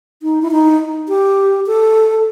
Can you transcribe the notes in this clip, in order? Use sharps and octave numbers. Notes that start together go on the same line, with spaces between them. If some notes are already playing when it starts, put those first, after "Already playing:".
D#4
E4
D#4
G4
A4